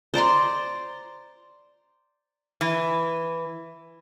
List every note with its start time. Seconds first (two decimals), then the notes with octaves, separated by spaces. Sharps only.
0.14 C5 D5 A#5 C6
2.61 E3